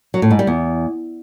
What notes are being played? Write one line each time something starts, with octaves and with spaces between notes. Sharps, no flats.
F#3
A2
G#2
G3
E2